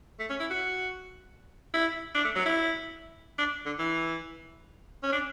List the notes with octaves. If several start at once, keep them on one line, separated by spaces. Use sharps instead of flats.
A3
C#4
E4
F#4
E4
D4
A3
F#3
E4
D4
D3
E3
C#4
D4